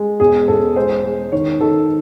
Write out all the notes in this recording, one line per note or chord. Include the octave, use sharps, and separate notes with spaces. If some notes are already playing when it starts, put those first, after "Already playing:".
Already playing: G#3
E1 G#4
E1 A4
G#3 C5
G#3
D#3 C#5
D#3 A4